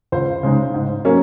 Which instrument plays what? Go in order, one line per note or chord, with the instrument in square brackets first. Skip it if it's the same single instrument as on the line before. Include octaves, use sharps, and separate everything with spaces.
[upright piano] C#2 C5
C#3 G#3 D#4
G#2
F#3 A#3 C#4